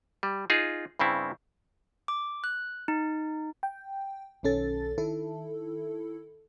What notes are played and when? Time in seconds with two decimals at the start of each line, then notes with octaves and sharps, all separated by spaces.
0.23 G3
0.50 D#4 F4 G#4
0.99 G2 C#3 C4 E4
2.08 D6
2.44 F#6
2.88 D#4
3.63 G5
4.43 B1 D#3 C#4 A4 A6
4.98 D#3 E4 A4